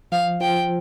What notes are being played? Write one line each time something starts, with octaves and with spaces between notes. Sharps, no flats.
F3 F5
F3 G5